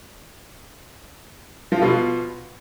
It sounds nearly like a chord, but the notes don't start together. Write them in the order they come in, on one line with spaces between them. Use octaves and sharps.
F3 F4 B2